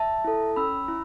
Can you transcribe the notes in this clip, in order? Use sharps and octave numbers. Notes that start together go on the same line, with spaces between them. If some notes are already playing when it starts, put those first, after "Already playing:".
Already playing: E5 A5
E4 A4
C#4 B5 E6
E4